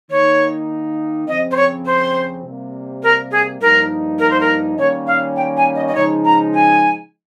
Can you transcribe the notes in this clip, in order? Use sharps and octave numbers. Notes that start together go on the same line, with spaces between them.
D#3 A#3 D#4 C#5
F2 C#3 F3 C4 D#5
C5
C#5
C5
C3 G3 A#3
A#4
G#4
G2 F3 A#3 D#4 A#4
A#4
C5
A#4
D#3 G3 A#3 C#4 C#5
F5
G5
G#5
D#5
D#5
C#3 F3 G#3 D#4 C#5
A#5
G#5